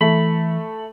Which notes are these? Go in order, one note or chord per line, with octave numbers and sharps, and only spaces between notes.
E3 A3 B5